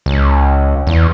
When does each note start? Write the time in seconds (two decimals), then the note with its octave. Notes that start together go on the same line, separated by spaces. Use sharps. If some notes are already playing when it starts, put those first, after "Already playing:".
0.06 C#2
0.87 E2